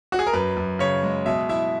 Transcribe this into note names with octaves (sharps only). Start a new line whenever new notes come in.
F#4
G#4
A#4
F#2 B4
F#2
C#3 C#5
G#3
B2 E5
E4 E5